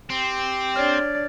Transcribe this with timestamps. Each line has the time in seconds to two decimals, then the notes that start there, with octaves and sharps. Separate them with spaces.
0.10 C4 G4
0.76 D4 C#5 D5 F6